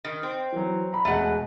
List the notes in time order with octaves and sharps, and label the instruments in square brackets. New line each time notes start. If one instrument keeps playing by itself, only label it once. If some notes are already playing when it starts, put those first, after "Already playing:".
[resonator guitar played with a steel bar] D#3
C4
[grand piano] E3 F#3
A#5 B5
[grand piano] E1 G#3 [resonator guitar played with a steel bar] A3 F#5